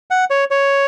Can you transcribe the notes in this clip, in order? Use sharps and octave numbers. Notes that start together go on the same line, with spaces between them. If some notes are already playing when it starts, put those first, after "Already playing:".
F#5
C#5
C#5